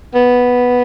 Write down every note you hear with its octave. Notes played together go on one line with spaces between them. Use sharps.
B3